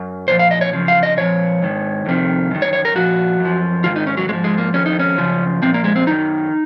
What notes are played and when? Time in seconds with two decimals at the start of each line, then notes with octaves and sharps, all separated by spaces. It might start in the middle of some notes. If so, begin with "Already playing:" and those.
Already playing: F#2
0.28 A#2 F3 C5
0.39 F5
0.51 D#5
0.61 C#5
0.73 F#2 C#3 F3
0.88 F5
1.03 D#5
1.17 A#2 F3 C#5
1.62 G#2 D#3
2.06 F2 C3 D#3
2.51 F#2 D#3
2.62 C#5
2.73 C#5
2.85 A#4
2.95 A#2 F3 F#4
3.40 F#2
3.45 F3
3.84 G#2 D#3 F4
3.96 D#4
4.07 C#4
4.17 F#3
4.29 G#2 G#3
4.33 F3
4.44 G#3
4.58 A#3
4.74 F2 D#3 C#4
4.86 D#4
4.99 C#4
5.18 F#2 C#3 F3
5.62 A#2 F3 C4
5.74 A#3
5.84 G#3
5.96 C4
6.07 F#2 D#3 D#4